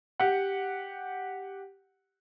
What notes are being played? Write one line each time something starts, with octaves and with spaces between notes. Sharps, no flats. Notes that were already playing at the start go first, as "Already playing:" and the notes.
G4 F#5